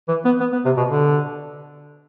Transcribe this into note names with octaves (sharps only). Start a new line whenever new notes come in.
E3
B3
B3
B3
C3
B2
D3